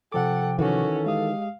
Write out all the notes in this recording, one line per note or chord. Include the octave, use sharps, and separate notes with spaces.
C3 F3 A4 F#5 G5 D6
D#3 E3 C#4 F#4 A4
G#3 G4 F5 D#6